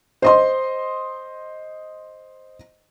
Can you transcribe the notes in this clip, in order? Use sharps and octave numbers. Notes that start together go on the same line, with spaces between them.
C5 D#5 C6